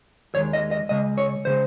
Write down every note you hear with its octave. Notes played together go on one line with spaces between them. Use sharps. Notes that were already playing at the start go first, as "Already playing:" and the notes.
D#2 D#3 G#3 C#5
D#5
D#5
C#2 C#3 G#3 D#5
C#5
C#3 G#3 C5